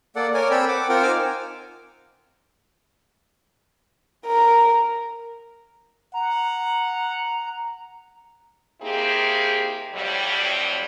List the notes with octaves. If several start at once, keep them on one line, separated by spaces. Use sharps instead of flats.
A#3 A4 D5 F#5
A#4 C#5 D5 G#5
C4 A4 G5 B5 E6
F#5 D6
C4 F4 A#4 F#5 G5
D#4 C5 G#5 D6 E6 F6
A#4
F#5 A#5
A#3 C4 D#4 E4 G4 G#4
F2 A2 C3 F#3 G3